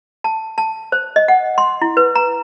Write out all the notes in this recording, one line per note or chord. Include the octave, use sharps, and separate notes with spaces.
A5
A5
C5
D#5
F#5
C6
E4
B4
A#5